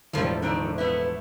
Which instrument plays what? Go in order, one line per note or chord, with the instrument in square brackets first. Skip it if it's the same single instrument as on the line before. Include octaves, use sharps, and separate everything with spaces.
[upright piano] E1 [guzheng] A2 F3 [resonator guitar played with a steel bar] G3 A3 F4
[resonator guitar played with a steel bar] D3 D#3 A3
[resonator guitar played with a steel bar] A3 B3 E4 [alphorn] B4